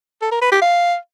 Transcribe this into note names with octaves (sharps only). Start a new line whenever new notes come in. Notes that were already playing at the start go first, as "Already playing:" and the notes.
A4
A#4
B4
G4
F5